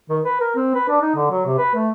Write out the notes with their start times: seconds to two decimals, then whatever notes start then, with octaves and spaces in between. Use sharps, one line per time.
0.10 D#3
0.25 B4
0.41 A#4
0.56 C4
0.75 B4
0.89 D4
1.02 D#4
1.15 D3
1.31 F#3
1.46 C3
1.58 B4
1.75 A3